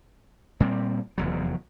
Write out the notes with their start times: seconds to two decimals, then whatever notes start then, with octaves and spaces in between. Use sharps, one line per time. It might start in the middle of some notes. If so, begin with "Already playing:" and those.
0.60 A#2 G3 C4
1.18 F1 E2 F#3